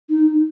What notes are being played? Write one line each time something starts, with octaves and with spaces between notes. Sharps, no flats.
D#4